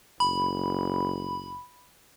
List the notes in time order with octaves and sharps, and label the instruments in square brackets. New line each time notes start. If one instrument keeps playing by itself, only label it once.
[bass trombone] F#1 [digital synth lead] B5